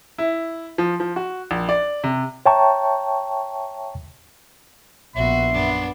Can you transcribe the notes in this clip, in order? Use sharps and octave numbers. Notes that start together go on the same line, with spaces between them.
E4
F3
F3
F#4
A#1
D5
C3
C#5 E5 G5 A5 A#5 C#6
A#1 B3 F#4 E5 C6
F#2 B3 D4